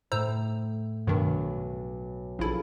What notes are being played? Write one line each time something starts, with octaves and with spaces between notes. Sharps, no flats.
A2 C5 A#5 E6
B1 G2 D#3
A#1 E4 F4 G#4 A4